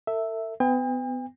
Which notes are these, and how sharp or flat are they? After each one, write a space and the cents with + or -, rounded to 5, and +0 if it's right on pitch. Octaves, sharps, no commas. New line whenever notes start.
A4 +40 E5 +0
B3 +35 G5 +45